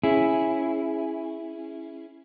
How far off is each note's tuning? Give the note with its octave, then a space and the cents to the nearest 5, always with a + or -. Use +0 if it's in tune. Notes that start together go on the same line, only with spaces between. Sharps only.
C#4 -10 E4 +0 G#4 +0